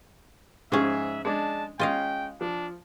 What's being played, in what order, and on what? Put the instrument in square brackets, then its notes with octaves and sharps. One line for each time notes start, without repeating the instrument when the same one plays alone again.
[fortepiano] G#2 G#4 [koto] F3 C#4 [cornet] E5
[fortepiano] G#3 D4 [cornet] A5
[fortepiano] G#3 C#4 [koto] F4 D#5 F5 [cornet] G5
[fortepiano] F3 [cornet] D4